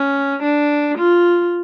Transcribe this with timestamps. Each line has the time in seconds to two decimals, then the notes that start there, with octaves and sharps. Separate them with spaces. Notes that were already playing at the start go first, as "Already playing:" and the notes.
Already playing: C#4
0.42 D4
0.97 F4